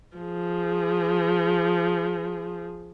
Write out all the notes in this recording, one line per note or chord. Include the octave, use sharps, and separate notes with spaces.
F3 G#4